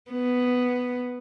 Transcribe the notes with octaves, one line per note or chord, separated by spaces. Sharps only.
B3